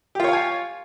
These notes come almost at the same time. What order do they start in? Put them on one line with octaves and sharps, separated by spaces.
G4 F4 C#5 F5 G#5